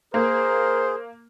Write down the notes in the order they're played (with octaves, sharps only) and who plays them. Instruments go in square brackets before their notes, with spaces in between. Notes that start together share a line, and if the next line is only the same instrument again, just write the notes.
[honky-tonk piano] A#3 [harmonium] G#4 [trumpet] A#4 [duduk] C5